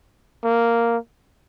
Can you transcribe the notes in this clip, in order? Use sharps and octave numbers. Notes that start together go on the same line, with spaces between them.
A#3